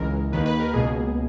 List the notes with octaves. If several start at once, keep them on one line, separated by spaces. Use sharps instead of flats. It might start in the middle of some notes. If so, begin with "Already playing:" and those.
Already playing: C#2 C#3 E3 G#3 A#4
D#2 D#3 A#3 B4
B4
A#4
C#2 B2 A#3 G#4